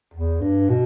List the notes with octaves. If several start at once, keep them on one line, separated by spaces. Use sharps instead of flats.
E2
G2
B2